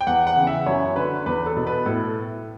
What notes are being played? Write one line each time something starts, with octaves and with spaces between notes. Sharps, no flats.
G5
E2 F#5
F#5
C#3 E3
E5
F#2 C#5
D3 B4
E2 B4
A4
B2
B4
A2 A4